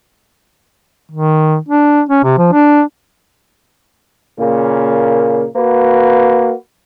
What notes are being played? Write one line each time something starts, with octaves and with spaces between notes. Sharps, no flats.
D#3
D4
C#4
C3
F3
D4
A#2 C#3 A#3
A#3 F#4 B4